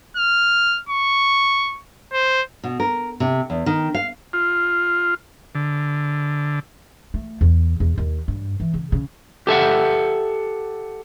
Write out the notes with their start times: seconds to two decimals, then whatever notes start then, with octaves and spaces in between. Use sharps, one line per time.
0.17 F6
0.89 C#6
2.13 C5
2.64 B2
2.80 A#4
3.20 C3
3.50 E2
3.66 D#3
3.95 F5
4.33 F4
5.55 D3
7.14 A3
7.41 E2
7.80 E2
7.98 D#2
8.28 G2
8.60 E3
8.74 C#3
8.92 C#3
9.47 G4 A4 E5 F#5